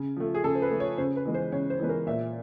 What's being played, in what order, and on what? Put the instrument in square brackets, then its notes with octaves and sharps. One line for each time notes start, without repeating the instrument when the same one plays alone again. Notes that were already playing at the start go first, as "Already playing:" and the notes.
Already playing: [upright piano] C#3
F3 A3
G#4
C#3 A4
C5
B4
F3 A3
C#5
C#3 C5
B4
E3 G#3 B3
C5
C#3 C#5
C5
E3 G#3 B3 B4
A#4
A#2 E5